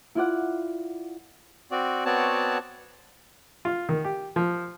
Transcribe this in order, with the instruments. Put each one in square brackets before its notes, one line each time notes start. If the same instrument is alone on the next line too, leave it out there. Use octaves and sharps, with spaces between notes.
[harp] E4 F4 D5 F#5
[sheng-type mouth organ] C4 F#4 D5
B3 C4 F#4 C#5 D5 A5
[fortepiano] F4
D#3
G4
F3